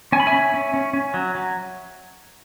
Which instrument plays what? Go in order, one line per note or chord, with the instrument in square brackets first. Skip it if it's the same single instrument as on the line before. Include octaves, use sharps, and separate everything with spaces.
[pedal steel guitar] C#4 G#5
B5
E5 G#5
C#4
C#4
C#4
C#4
F#3
F#3